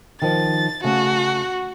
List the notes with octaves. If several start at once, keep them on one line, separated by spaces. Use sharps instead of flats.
D#3 F3 A6
C#3 A3 F#4